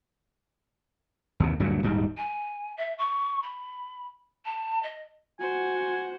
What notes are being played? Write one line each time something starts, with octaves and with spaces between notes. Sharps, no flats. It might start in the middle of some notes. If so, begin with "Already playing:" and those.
D#2 C3
D2 G2 A#2 F#3
D#1 G#2 G3
G#5
E5
C#6
B5
A5
D#5
F#4 C5 F#5 G#5